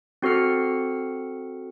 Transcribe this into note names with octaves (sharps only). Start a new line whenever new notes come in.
C4 F#4 A4 F6 C#7